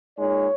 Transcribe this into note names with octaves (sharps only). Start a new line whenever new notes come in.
A#2 G#3 D#4 C#5